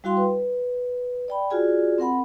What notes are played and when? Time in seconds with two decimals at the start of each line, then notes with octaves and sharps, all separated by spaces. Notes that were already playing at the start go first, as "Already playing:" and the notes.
0.04 G3 E4 F#4 F5 G5 C6
0.17 B4
1.28 D5 G5 B5
1.50 F4 F#4 G#4 D5 G#5
1.98 C4 A#4 F#5 B5